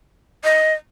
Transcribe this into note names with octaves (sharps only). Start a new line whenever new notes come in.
D#5